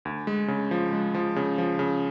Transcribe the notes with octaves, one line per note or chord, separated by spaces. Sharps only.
D2
G#3
C#3
F3
G#3
F3
C#3
F3
C#3